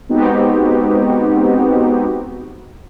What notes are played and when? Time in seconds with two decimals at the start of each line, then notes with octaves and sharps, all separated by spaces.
0.09 G#3 B3 C4 D#4 F#4 G4